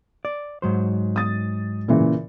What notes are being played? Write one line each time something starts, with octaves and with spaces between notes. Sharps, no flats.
D5
G#2 F#3 C5
D#6 A6
A#2 C#3 E3